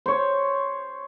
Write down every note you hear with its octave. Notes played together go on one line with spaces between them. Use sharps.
C5 C#5